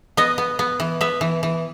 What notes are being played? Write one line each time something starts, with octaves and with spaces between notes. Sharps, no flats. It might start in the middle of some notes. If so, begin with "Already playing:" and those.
B3 D#5
B3
B3
E3
B3 E5
E3
E3